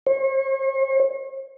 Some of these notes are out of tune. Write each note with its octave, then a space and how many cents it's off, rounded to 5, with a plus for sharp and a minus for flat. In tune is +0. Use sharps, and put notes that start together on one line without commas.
C#5 -45